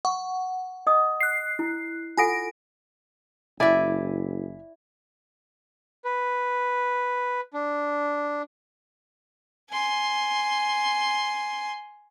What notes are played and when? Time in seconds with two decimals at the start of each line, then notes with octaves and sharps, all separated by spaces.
0.05 F#5 C#6
0.87 D#5 D#6
1.21 F#6 C7
1.59 E4
2.17 F4 A4 F#5 G#5 A#6 D7
3.60 F#1 E4 D5 E5 G#5
6.05 B4
7.54 D4
9.70 G#5 C6